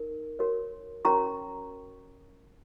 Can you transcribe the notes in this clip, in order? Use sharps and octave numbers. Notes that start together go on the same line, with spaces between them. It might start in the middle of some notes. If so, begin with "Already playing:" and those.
Already playing: D#4 A#4
F#4 A#4 C#5
C#4 F#4 A#4 C#5 A#5 C#6